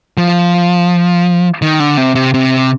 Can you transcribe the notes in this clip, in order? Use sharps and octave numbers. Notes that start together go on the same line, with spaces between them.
F3
D#3
D3
C3
C3
C3